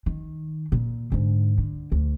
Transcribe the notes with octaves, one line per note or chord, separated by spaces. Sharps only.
D#3
A#2
G#2 D3
D3
D2